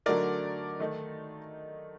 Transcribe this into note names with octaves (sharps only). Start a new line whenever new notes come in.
D3 F#3 A3 D#4 A#4 D5
D#3 A3 D#4